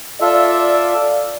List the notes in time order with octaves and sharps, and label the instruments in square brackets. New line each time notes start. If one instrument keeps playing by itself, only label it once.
[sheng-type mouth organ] F4 A4 E5 [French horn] D5